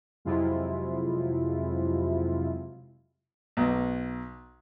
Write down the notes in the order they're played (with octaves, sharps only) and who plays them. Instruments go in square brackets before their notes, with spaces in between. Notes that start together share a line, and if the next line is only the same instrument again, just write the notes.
[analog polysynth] F2 C3 F#3 G#3 E4 F4
[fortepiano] B1